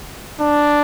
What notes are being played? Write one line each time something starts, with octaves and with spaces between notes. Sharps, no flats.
D4